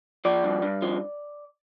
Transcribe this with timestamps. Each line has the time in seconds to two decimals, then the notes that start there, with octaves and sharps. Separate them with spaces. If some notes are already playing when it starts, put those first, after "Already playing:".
0.25 F3 D5
0.44 G2
0.63 G2
0.82 F3